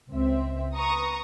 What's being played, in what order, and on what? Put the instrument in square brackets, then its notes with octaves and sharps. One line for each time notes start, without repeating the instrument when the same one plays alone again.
[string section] C#2 C4 E5
B4 A#5 C#6 D#6